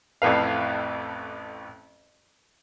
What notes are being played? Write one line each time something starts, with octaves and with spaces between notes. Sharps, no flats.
A1 F2 A2 B4 F5